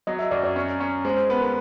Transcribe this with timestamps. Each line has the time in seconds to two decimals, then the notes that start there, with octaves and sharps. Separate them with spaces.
0.07 F#3 D#5
0.19 E5
0.31 F#2 D5
0.44 C#5
0.56 C#4
0.80 C#4
1.05 G#3 C5
1.17 C5
1.29 B3 B4
1.42 A#4